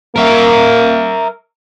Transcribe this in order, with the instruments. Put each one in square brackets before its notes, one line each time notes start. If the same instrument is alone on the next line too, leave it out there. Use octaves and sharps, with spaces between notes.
[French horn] A#3 [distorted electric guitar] A#4 E5